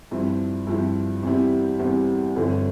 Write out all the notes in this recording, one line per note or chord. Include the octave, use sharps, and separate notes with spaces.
G2 F3 C4 E4
G2 F3 C4 E4
E2 C3 G3 C4 E4
E2 C3 G3 C4 E4
G1 G2 D3 F3 C4